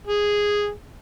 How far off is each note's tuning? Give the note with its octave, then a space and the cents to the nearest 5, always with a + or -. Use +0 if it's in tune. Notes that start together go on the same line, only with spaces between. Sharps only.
G#4 -5